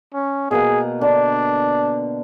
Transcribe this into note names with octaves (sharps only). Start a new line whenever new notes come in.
C#4
B2 A#3 G#4
D3 D4